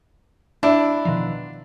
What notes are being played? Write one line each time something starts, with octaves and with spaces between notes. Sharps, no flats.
D4 E4
B2 D#3 F3